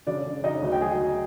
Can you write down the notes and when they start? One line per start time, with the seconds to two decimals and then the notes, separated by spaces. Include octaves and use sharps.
0.07 C#3 D4 D5
0.26 C#3
0.44 C#3 D#4 D#5
0.62 D2
0.72 G5
0.81 F#3 G#4 G#5
0.99 F#3